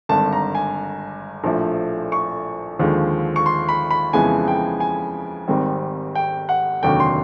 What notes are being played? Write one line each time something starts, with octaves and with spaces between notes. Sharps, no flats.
G#1 G2 D3 A5
A#5
G#5
A#1 A2 F3 A3
C#6
D#2 D3 F3 G#3
C#6
C6
B5
B5
F2 C#3 E3 G#3 B3 G#5
G5
G#5
G#1 G#2 D#3 G3 C4
G5
F#5
F1 D#2 D3 F#3 G5
C6